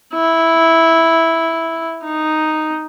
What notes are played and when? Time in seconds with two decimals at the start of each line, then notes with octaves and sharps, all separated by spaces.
0.14 E4
2.04 D#4